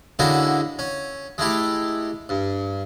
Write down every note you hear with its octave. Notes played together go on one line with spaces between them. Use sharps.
D3 G#3 A#3 C#4 E4 F#4
C#4
G#3 A3 E4 G4
G2